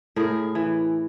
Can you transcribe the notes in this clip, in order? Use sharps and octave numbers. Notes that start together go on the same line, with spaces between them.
A2 G#4 A#4
E3